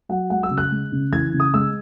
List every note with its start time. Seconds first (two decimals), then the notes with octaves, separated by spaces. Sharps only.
0.09 F#3 F#5
0.30 G#3 F#5
0.43 E6
0.50 C#3
0.57 F#6
0.71 G#3
0.92 C#3
1.12 E3 G#6
1.33 C#3
1.40 D#6
1.54 G#3 E6